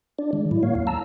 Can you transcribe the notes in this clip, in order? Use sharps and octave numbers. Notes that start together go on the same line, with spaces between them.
D4 D5
D#3 G#3
A2 F#3 E4
A#3 C#5 F5
D#2 F5
A5 A#5 E6